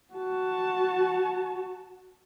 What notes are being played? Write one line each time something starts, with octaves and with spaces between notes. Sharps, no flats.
F#4 A5